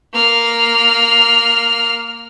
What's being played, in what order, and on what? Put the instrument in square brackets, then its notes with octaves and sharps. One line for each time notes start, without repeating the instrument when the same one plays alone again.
[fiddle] A#3 F6